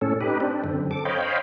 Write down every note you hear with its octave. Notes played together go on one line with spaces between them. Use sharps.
A2 C#4 A4
D#4 G4 B4
C4 D4
F#2 D3 C4
A4 D6
C5 C#5 D#5 F5 G5 B5